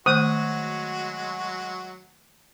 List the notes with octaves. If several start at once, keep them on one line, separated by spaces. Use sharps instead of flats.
D#3 F#3 G#3 A3 F#4 C5 D#6